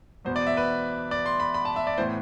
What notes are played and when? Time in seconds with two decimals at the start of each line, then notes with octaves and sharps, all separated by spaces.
0.25 E2 B2 B3 C5
0.36 D5
0.47 E5
0.57 B4
1.11 D5
1.26 C6
1.40 B5
1.54 B5
1.65 A5
1.76 E5
1.87 D5
1.98 A2 E3 B3 C5